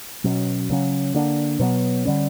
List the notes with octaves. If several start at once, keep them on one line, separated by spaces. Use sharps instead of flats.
B2 F#3 C#4
C#3 F#3 C#4
D3 A#3 D4
B2 F#3 B3
D3 G3 C#4